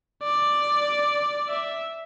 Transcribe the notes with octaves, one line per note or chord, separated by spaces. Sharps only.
D5
E5